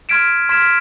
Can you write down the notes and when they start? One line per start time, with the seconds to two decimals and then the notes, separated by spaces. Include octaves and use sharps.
0.09 C6 F6 G#6 B6 D7 E7
0.49 C6 F6 G#6 B6 E7